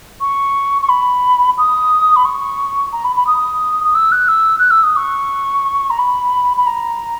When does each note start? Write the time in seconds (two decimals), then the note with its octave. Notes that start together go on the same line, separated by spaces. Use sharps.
0.21 C#6
0.82 C#6
0.89 B5
1.58 D#6
2.16 B5
2.25 C#6
2.92 A#5
3.04 B5
3.16 B5
3.27 D#6
3.84 D#6
3.95 E6
4.12 F#6
4.28 E6
4.59 F#6
4.71 E6
4.83 D#6
4.96 C#6
5.90 A#5
5.98 B5
6.57 B5
6.67 A#5